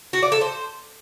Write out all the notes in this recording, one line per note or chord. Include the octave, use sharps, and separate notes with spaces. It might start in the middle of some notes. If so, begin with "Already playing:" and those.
F#4
D5
A4
C5